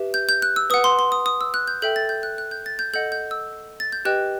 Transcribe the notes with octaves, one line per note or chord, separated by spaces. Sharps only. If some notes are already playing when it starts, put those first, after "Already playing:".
Already playing: G4 B4 E5
G6
G6
F#6
E6
B4 F#5 D#6
C6
C6
D#6
D#6
E6
F#6
G6
A4 E5 G5 G6
A6
G6
F#6
F#6
G6
A6
G6
A4 D#5 F#5 G6
G6
E6
A6
G6
G4 B4 D#5 G5 F#6